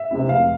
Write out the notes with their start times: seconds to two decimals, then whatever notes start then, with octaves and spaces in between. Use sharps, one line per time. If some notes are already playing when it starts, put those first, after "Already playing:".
Already playing: E5
0.11 C3 G#3 C4 E4
0.29 F1 F5